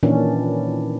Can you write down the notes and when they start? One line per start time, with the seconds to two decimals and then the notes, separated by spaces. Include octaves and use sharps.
0.03 A#2 D#3 E3 C#4 D4